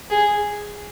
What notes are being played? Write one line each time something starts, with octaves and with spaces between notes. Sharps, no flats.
G#4